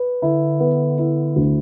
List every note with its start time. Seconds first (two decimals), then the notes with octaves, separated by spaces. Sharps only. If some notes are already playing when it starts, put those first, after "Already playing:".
Already playing: B4
0.22 D3 E4
0.60 B3
0.98 E4
1.36 D2